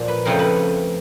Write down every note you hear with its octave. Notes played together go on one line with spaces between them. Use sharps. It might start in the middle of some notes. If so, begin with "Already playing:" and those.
Already playing: A#2 F3 A#3 D5
B4
F2 C#3 F3 A3 A#4
B4